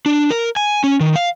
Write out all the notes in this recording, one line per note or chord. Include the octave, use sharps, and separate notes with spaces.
D4
A#4
G#5
C#4
D#3
F5